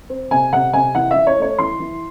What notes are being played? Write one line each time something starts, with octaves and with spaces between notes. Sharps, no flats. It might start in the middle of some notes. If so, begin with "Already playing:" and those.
C4
C3 G#5
C3 F#5
C3 G#5
E3 F#5
E3 E5
C#5
A3 C#5
E3 C6
E3